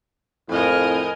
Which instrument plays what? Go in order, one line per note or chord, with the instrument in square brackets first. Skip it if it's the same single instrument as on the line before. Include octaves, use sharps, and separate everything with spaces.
[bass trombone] F2 [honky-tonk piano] A2 F6 [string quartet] A#4 D#5 G#5